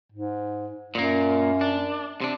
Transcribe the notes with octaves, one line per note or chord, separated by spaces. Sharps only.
G#2
F#2 A#2 A#3
D4
C3 D4